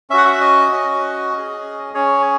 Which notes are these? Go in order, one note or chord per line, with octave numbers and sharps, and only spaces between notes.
C#4 F#4 E5 F#5
E5
D#5
C#4 F#4
C#4 G#4
C#4 G#4 C#5